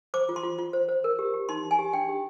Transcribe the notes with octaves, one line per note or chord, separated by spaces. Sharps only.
C5 D6
F4
C6
F4
F4
C5
C5
A#4
G4
G4
D#4 C6
D#4
G#5
G4
D4 G5
G4